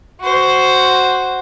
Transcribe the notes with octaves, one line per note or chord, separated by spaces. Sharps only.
F#4 C5